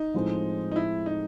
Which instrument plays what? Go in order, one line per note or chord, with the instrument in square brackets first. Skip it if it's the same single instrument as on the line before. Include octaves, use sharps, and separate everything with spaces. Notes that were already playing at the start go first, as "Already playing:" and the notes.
Already playing: [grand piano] D#4
[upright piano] A2 F3 G#3 C4
[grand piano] D#4
E4
D#4